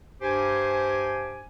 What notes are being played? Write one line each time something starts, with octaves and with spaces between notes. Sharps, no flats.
G2 G4 C5 G#5